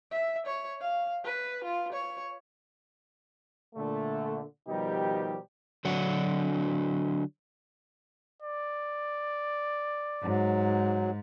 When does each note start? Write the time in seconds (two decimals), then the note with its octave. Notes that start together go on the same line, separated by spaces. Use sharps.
0.11 E5
0.46 C#5
0.81 F5
1.25 B4
1.64 F4
1.93 C#5
3.75 A#2 D3 A3
4.68 B2 D#3 F3 G3 D#4 G4
5.85 D3 F#3 D4 F#4
8.42 D5
10.23 G#2 F#3